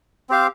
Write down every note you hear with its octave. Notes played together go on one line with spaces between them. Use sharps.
C4 G4 C5 F5